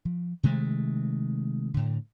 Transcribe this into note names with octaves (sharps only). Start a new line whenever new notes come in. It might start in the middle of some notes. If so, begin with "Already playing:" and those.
F3
C3 D#3 G#3 A3
A2 D3